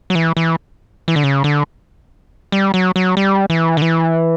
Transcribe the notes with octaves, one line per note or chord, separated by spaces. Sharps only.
F#3
E3
E3
E3
D3
C#3
D3
G3
F#3
F#3
G3
E3
D3
E3